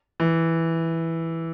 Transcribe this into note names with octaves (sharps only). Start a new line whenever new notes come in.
E3